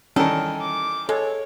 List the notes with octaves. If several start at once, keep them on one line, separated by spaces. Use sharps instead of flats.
D#3 E3 G3 C#4 A4 A#4
D6
G#3 A4 C#5